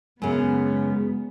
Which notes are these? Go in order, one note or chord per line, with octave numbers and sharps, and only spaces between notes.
F#2 C#3 G#3 B3